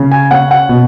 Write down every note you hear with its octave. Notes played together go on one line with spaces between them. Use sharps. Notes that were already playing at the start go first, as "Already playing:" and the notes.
Already playing: C#3
G#5
C#4 F#5
F#5
B2